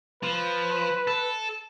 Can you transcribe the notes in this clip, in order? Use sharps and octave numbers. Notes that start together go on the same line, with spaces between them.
F3 B4
A4